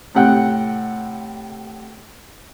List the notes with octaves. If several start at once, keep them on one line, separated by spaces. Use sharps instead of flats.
A2 C3 F#5 G5 F#6